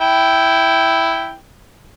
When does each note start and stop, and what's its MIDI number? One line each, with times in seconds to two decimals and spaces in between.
0.01 1.35 64
0.01 1.35 79